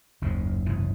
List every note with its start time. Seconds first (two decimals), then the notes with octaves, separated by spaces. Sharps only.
0.22 F#1 D#2 G#2
0.66 F#1 C2 G#2 E3